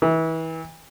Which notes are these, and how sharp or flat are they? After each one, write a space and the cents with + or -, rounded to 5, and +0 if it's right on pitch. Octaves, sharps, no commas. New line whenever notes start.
E3 -30